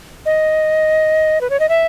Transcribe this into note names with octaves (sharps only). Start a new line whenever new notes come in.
D#5
B4
C#5
D#5
E5